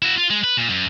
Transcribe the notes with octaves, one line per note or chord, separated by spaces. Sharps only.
E4 F#4
F4
G#3
B4
A#2
F#2